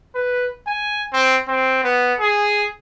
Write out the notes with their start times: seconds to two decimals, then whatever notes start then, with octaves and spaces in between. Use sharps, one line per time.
0.15 B4
0.67 G#5
1.13 C4
1.48 C4
1.83 B3
2.19 G#4